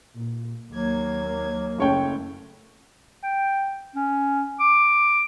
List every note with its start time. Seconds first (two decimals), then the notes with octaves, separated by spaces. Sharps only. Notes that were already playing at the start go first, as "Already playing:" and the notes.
0.14 A#2
0.73 D#2 F#3 A#3 G#6
1.78 F#1 A3 C#5 G5
3.23 G5
3.95 C#4
4.60 D6